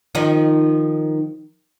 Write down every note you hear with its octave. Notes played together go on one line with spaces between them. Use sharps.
D#3 F3 D#4